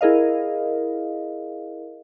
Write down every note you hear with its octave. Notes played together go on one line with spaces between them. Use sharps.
E4 G#4 A#4 D#5 F5